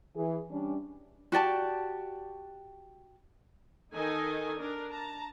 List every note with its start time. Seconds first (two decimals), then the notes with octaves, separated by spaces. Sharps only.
0.15 E3 G#4
0.50 G3 C#4 D4
1.32 F#4 G4 D5 A5
3.93 D#3 D#4 A4 D#5 G#5
4.57 D4 A#4
4.91 A5 A#5